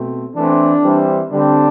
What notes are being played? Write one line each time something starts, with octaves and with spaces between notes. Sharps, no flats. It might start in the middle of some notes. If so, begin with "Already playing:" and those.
Already playing: B2 A3 C4
E3 A3 C4 D4
E3 G3 C4
D3 G3 C4 D4